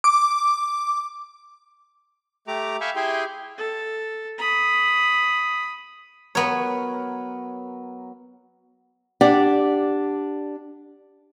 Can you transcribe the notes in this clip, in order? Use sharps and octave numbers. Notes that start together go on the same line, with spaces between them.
D6
A3 G4 A#5 D6
E5 F5 G5 G#5 B5 C#6
E4 G4 G#4 G5 G#5 C6
A4
B5 D#6
F#3 B3 A#4 C#5
D4 G4 D5 F#5